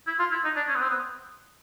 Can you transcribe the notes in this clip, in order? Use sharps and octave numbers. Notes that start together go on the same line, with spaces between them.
E4
F4
E4
D#4
D4
C#4
B3
C4
B3